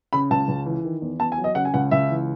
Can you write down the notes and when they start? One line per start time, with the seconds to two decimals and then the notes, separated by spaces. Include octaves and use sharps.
0.13 C#3 B5
0.30 C#2 A5
0.48 C#2
0.66 E3
0.85 D#3
1.01 E2
1.20 E2 A5
1.32 G#5
1.38 F#3
1.44 D#5
1.55 C#3 F#5
1.65 G#5
1.74 C#2 F#5
1.91 C#2 E5
2.09 E3